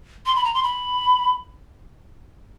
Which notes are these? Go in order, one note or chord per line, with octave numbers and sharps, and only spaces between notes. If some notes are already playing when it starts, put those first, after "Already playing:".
C6
B5
A#5
C6
B5